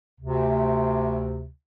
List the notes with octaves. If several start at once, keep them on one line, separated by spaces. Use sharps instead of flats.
D2 C3